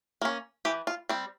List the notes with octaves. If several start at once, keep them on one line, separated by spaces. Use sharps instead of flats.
A#3 C#4
E3 G4
F4
G3 C4